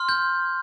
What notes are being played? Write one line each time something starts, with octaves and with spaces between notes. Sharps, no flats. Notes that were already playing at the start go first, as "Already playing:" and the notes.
Already playing: C6 F6
G6